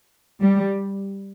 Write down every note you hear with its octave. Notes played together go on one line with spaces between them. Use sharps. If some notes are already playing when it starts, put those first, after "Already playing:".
G3